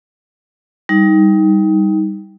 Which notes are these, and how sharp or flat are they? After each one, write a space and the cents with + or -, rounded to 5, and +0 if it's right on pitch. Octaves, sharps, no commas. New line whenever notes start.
G3 +0 D#4 +20